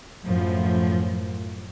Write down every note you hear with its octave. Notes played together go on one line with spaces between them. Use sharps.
F#2 A2 F3